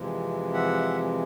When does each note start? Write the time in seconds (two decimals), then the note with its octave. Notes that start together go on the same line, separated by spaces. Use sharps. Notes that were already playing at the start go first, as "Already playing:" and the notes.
Already playing: F2 C3 E3 G#3
0.54 E5 F#5